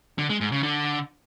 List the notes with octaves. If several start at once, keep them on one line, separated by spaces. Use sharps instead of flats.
D3
G#3
G#2
C#3
D3